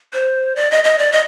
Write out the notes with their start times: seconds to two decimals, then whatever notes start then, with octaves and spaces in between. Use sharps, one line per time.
0.13 C5
0.56 D5
0.71 D#5
0.84 D#5
0.98 D5
1.12 D#5